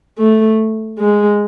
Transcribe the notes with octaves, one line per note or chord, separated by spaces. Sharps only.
A3
G#3